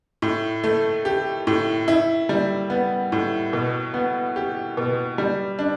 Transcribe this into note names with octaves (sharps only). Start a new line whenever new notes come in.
A2
A3
G4
A2
E4
G3
B3
A2
B2
B3
G4
B2
G3
D4